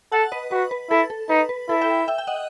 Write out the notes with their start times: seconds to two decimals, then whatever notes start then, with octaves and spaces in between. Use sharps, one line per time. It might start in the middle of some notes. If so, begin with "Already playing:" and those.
0.12 A4 F#5 A5
0.32 B4 D#5
0.51 F#4 B4
0.71 B4
0.90 E4 A4
1.10 A4
1.29 D#4 B4
1.49 B4
1.69 E4 A4
1.81 E5 G5
2.08 E5 G5
2.18 G5
2.27 D#5 F#5